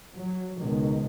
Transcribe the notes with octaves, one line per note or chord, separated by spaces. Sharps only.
F#3
C#2 B2 D#3